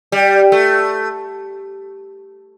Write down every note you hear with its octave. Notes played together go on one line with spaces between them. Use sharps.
G3
A3